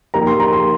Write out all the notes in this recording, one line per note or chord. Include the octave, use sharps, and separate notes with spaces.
F3 A#3 D#4 G4 A#4 A#5
C6
A#5
C6